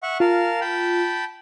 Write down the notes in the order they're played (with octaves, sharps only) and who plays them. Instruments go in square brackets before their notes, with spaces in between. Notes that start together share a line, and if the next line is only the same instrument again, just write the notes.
[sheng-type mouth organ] E5 F#5 C#6
[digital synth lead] F4 [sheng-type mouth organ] A#4 F5 A5
[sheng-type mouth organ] G5 A5 B5